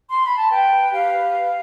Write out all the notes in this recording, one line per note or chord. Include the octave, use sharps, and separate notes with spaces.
C6
B5
A5
B4 G5
B4
G4 F5
B4